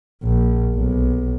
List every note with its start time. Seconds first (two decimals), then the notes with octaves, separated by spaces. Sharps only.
0.24 A#1
0.76 B1